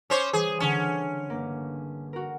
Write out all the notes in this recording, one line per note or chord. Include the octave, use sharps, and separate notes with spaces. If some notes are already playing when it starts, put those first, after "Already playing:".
C#4 C5 C#5 D6 C#7 E7
E3 G3 G#4
D3 C#4 C#5 E7
G1 A#3
F#4 A#4